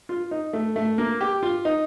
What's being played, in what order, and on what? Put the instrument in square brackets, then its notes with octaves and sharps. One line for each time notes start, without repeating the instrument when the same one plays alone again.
[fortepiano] F4
D#4
A3
A3
A#3
G4
F4
D#4